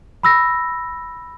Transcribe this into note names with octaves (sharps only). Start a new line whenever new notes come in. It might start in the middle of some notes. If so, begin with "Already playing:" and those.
B5 E6 A#6